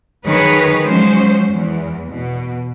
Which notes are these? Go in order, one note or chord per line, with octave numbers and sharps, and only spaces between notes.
D#3 F#3 G#4 B4 C#5
F3 F#3 G#3 C#4 C5
E2
B2